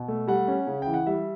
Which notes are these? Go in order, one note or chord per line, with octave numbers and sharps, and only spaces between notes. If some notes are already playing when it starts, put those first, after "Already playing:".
Already playing: B2
A3
G3 F#5
C#4
C#3
E3 G5
F#5
G3 E5